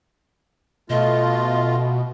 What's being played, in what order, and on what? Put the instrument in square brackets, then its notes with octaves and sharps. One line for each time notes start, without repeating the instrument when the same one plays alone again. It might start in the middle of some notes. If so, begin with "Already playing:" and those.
[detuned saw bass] B2 [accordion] A3 F4 [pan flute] D#5